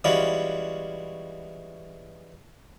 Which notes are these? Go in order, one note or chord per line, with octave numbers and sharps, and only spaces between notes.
E3 G3 G#3 C#4 F4 F#4